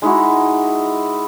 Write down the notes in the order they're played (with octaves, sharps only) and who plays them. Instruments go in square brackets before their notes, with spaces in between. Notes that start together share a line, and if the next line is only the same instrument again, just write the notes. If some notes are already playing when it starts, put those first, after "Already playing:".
[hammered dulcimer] G#3 D#4 E4 F#4